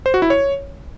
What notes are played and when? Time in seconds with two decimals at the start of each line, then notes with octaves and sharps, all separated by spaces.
0.06 C5
0.14 F#4
0.22 E4
0.30 C#5